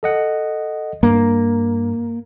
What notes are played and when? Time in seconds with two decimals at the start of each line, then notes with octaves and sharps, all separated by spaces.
0.03 A4 D#5 F#5
1.03 G2 A#3